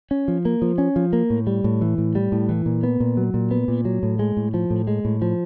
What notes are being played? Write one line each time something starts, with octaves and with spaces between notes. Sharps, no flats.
C#4
F3
A#3
F3
C#4
F3
A#3
A2
G3
A2
E3
A2
G3
A2
E3
A#2
B3
A#2
F#3
A#2
B3
A#2
F#3
A2
G#3
A2
F3
A2
G#3
A2
F3